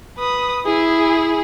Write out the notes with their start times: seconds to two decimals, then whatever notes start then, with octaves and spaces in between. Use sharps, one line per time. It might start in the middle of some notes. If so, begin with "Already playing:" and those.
0.18 B4 D#6
0.65 E4 G#4